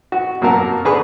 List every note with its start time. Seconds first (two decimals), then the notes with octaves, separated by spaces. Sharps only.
0.12 F#4
0.42 F#2 A#3 F#4 A#4 A5
0.85 D3 G#4 B4 C#6